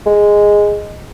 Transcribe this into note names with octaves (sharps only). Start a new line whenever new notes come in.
G#3